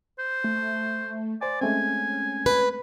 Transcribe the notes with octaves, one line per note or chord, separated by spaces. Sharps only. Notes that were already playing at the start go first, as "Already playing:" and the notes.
C5
A3
C5 D5 G#5
G#3 A3 C4 C#4 G#5
B4